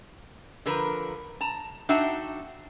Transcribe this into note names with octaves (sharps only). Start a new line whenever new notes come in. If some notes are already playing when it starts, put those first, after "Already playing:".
D3 F3 A#4 B4
A5 A#5
D4 D#4 F#4 E5 F#5 G5